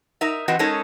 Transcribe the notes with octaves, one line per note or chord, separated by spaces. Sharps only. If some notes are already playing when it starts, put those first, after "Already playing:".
D#4 A#4 E5
E3 C4 F#4 B4 D#5
G#3 C#4 D#4 A4 A#4 C#5